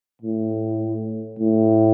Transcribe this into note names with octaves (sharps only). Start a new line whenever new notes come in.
A2
A2